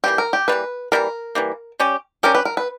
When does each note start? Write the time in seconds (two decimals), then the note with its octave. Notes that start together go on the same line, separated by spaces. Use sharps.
0.04 E3 G3 A#3 G4
0.18 A#4
0.33 G4
0.48 E3 G3 A#3 B4
0.92 E3 G3 A#3 A#4
1.35 E3 G3 A#3
1.79 G3 C#4 G4
2.23 G3 C#4 G4 A#4
2.35 B4
2.45 A#4
2.57 B4